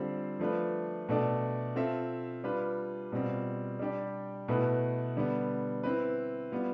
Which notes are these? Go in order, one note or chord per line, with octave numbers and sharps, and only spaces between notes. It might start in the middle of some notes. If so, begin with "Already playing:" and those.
Already playing: D3 G3 C4 F4 C5
F3 A3 D4 F4 B4
B2 A3 D4 A4 D5
C4 F4 A4 E5
G3 D4 F4 B4
B2 G3 C4 F4
G3 D4 G4 D5
B2 A3 E4 B4
D3 G3 B3
C4 E4 B4
G3 B3 F4